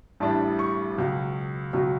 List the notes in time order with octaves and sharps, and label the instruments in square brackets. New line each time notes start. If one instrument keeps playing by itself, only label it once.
[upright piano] A1 A2 G3 D4 A5
C#6
C#2 B2 F#3
C#2 B2 F#3